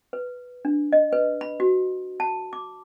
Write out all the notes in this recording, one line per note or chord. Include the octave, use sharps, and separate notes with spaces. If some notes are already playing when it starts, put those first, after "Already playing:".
B4
D4
D#5
B4
B5
F#4
A5
D6